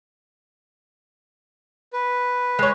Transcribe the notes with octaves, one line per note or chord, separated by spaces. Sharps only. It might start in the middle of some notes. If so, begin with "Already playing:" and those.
B4
G#3 C#5